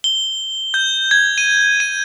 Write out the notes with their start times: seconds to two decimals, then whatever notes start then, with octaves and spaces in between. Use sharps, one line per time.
0.04 G7
0.74 G6
1.11 G#6
1.38 D#7
1.80 D#7